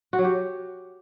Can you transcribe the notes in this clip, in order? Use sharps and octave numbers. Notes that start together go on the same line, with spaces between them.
F#4
F#3
G4